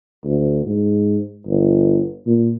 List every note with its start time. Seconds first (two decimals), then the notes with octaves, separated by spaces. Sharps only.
0.25 D2
0.65 G#2
1.47 G1
2.27 A#2